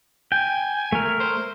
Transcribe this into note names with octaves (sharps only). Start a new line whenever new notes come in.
G5 G#5
A3 A#4
C5